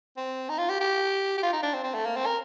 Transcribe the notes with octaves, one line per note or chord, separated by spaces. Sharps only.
C4
D#4
F4
G4
G4
G4
F4
D#4
D4
C4
C4
A3
A#3
C4
A#4